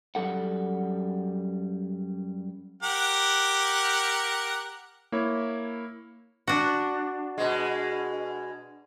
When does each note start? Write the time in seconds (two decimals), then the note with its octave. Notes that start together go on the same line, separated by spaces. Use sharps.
0.15 F#2 G3 A4 F#5
2.83 G4 A#4 F#5
5.12 A#3 E4 C#5
6.47 D4 F#4
7.38 B2 G#3